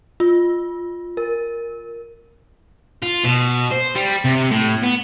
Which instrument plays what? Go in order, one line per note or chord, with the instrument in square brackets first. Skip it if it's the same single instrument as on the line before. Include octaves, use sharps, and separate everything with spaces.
[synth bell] F4
A#4
[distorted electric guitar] F4
B2
C5
G3
C3
A2
B3